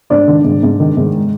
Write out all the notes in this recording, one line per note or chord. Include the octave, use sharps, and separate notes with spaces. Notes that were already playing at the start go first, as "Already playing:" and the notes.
G#2 D4 D5
D#3
G#2
G#2
D#3
G#2
G#3